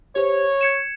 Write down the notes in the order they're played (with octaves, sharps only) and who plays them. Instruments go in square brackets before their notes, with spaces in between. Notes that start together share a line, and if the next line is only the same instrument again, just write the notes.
[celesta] G4 C5 [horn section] C#5
[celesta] G#6 C#7 E7